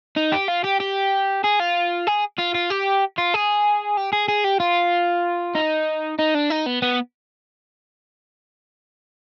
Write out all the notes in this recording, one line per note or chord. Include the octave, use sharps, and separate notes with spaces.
D#4
G4
F4
G4
G4
G#4
F4
G#4
F4
F4
G4
F4
G#4
G4
G#4
G#4
G4
F4
D#4
D#4
D4
D#4
B3
B3